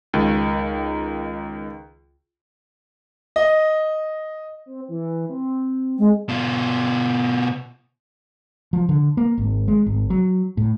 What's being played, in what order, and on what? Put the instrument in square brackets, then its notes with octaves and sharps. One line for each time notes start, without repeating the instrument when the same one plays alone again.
[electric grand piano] C#2 D#3
[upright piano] D#5
[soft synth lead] C4
E3
C4
[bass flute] G#3
[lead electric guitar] B2 F4
[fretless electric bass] F3
D3
A#3
G#1
G#3
G#1
F#3
A2